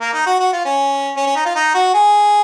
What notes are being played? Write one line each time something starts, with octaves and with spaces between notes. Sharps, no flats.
A#3
D#4
F#4
F#4
F4
C#4
C#4
C#4
D#4
F4
D#4
F#4
G#4